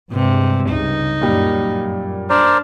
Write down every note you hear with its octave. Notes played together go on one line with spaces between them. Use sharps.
G2 C3 G#3
C#2 G2 C#3 D#4
F#2 A#2 G3
D4 A#4 C5 D5